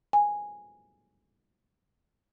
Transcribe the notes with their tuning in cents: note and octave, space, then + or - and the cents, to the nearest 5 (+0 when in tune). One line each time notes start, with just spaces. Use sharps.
G#5 -5